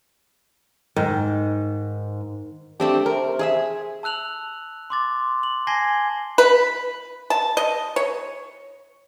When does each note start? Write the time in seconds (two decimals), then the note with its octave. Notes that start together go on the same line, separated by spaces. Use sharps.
0.96 G#2 D#3
2.80 A3 C4 D4 G4
3.06 C3 A#4
3.39 G#4 D#5 E5
4.03 A5 E6 F#6 F7 F#7
4.90 C6 D6 A6
5.43 F#7
5.67 G#5 A5 G#6 A#6 C7 G7
6.38 B4
7.30 A5
7.57 D#5
7.96 C#5